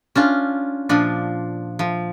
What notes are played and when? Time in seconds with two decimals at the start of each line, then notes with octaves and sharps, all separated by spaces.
0.15 C#4 D4 F4
0.89 A#2 F3 D4
1.79 F3